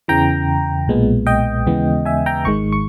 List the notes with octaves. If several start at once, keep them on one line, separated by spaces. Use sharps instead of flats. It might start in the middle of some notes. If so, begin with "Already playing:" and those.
E2 C#3 E3 G5 A#5
B1 A#2 G#3 B3
D#5 G5
D#2 C#3 E3 G#3 B3
E5 G#5
G5 A#5
G#1 G#2 D#3 G#3 C#6
C#6